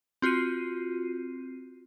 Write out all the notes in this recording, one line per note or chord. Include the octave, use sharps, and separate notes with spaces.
C4 F4 F#4 C7 D#7